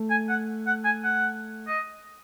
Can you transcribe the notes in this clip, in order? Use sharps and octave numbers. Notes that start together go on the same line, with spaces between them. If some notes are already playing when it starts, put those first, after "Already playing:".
Already playing: A3
G#5
F#5
F#5
G#5
F#5
D#5